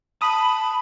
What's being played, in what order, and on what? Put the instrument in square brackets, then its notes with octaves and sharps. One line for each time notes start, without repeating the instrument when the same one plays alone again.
[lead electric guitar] A5 [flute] B5 [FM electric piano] D#6